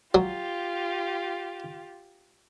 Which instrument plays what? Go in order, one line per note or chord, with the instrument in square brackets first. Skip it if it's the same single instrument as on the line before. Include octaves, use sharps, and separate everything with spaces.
[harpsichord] F#3 [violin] F4 G4